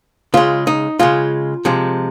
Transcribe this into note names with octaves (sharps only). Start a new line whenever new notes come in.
C#3 G#3 F4
D#4
C#3 G#3 F4
C3 F3 G#3